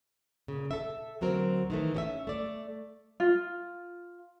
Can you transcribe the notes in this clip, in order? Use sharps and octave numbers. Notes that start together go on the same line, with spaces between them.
A#2 C#3
A4 E5
D2 F#3 C4 A#4
D#3 E3 A3
C#4 G4 E5
A3 D5
F4